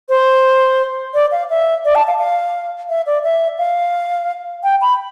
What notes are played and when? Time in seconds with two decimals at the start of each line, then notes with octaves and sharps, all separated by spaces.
0.09 C5
1.14 D5
1.32 F5
1.50 E5
1.85 D5
1.95 A5
2.07 F5
2.19 F5
2.89 E5
3.06 D5
3.24 E5
3.58 F5
4.64 G5
4.82 B5